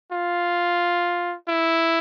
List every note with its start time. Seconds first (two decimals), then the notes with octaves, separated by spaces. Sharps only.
0.12 F4
1.48 E4